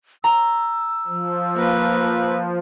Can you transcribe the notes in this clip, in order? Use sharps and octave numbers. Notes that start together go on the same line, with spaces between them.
A#5 E6
F3
A#3 B4